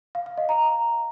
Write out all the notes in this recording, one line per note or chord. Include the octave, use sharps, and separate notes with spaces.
F5
F5
D#5
A#5